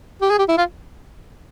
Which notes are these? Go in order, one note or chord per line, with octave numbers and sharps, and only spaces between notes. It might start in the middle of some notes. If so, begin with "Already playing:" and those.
G4
G#4
G4
E4
F4